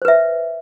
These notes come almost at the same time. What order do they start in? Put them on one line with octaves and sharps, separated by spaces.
C5 B4 E5